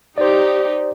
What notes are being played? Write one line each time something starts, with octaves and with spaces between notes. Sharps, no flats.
D#4 G4 C5 D5